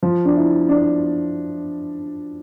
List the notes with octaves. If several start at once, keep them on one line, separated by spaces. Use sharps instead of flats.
F3
D4
E4
D4